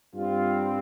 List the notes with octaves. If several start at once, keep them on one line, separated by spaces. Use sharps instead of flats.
G2 G3 C4 F4